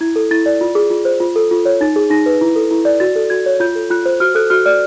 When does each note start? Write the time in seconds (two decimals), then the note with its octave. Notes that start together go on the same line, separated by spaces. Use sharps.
0.01 E4 G#6
0.16 A4
0.31 E4 A6
0.46 D5
0.61 F4
0.75 G#4
0.91 F4
1.05 C5
1.20 F4
1.36 A4
1.51 F4
1.65 C#5
1.81 D#4 A6
1.96 G#4
2.10 D#4 A#6
2.26 B4
2.41 E4
2.56 A4
2.71 E4
2.85 D5
3.00 F#4 A6
3.16 A4
3.30 F#4 G#6
3.46 C#5
3.60 F4 G6
3.75 A4
3.90 F4 F#6
4.06 C5
4.20 F#4 F6
4.35 A4 F#6
4.50 F#4 F6
4.66 D5 F6